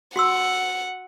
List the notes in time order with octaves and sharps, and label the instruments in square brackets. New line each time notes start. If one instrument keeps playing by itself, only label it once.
[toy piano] F#4 C6 E6 [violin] F#5